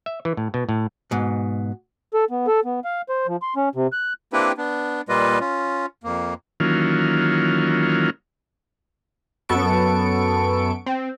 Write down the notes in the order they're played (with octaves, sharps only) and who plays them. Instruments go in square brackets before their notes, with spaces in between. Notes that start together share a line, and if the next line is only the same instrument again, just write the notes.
[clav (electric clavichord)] E5
E3
A2
B2
A2
[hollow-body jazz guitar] G#2 B2
[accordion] A4
B3
A4
B3
F5
C5
F3
C6
C#4
C3
F#6
[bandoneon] A#3 C4 D4 E4 G4 B4
B3 D4
A#2 G3 A#3 F4 B4 D#5
C#4 F4
F2 A#3
[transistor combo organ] D#3 E3 F#3 A#3 C#4 F4
[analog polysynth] F#2 B3 A4 C#6 D7
C4